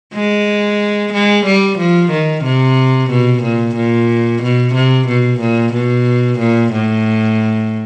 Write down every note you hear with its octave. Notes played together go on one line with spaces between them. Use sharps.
G#3
G#3
G3
F3
D#3
C3
B2
A#2
A#2
B2
C3
B2
A#2
B2
A#2
A2